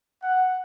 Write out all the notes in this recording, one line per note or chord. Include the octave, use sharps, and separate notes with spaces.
F#5